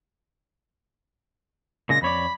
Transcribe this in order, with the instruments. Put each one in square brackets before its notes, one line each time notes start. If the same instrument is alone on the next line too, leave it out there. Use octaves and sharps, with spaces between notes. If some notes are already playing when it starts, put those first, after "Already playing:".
[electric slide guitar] A#2 C#3 G#3 [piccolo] A#6
[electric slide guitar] F2 C#5 D5 [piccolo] B5